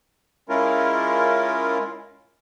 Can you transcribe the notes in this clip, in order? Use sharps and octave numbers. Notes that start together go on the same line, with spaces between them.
G#3 C#4 E4 F4 A#4